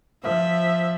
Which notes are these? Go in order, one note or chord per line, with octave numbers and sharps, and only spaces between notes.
F3 E5